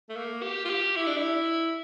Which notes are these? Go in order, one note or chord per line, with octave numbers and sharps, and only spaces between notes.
A3
A#3
G4
F4
G4
E4
D4
E4